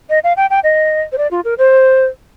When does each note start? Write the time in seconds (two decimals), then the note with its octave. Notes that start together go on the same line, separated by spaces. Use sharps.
0.10 D#5
0.24 F5
0.37 G5
0.50 G5
0.64 D#5
1.12 C5
1.18 D5
1.31 F4
1.45 A#4
1.58 C5